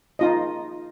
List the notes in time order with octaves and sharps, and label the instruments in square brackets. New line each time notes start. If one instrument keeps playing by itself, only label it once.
[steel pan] D#4 F4 D#5